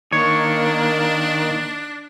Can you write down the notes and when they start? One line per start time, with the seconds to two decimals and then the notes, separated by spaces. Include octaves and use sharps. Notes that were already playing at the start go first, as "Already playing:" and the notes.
0.12 D#3 A#3 D4 C#5